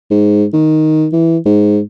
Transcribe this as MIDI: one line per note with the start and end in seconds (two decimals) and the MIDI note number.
0.11 0.45 44
0.53 1.08 51
1.13 1.37 52
1.46 1.80 44